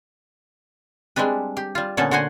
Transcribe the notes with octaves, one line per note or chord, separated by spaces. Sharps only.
G3 G#3 C4 D4 B4
G4
G3 F4
A#2 D3 B3 C#4 A4 A5
D3 F#4 C5 F#5 G#5